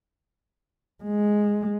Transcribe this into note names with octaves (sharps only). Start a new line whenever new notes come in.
G#3